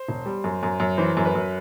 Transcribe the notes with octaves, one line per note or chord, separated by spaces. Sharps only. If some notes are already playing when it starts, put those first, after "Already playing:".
Already playing: C5
E1
G3
F#2
F#2
F#2
E3 C5
F#2
B4
F#2